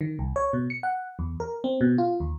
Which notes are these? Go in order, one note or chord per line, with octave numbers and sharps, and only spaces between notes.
D#3
C2
C#5
B2
C#7
F#5
E2
A#4
C4
B2
F4
D#2